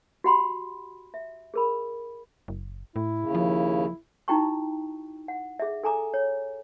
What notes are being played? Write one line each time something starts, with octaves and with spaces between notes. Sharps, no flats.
F#4 G4 F#5 G5 B5 C6
E5
G#4 A#4 B5
F#1
A2 E4
D#2 C#3
F3
D#4 E4 F#4 G5 A#5 C#6
F#5
G#4 E5
A4 G#5 A#5 D6
C#5